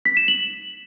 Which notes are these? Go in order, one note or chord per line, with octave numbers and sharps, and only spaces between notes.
B6
E7
F#7